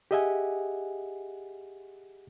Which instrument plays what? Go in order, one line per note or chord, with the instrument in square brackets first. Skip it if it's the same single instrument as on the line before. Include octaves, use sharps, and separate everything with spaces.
[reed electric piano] G4 G#4 D#5 E5 F#5 G#5